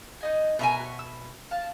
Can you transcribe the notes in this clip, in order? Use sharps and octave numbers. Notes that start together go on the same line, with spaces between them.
D#4 D#5 G#5
B2 A#4 E5 G#5 A#5 F#6
F#4 C#5
E6
F5 A5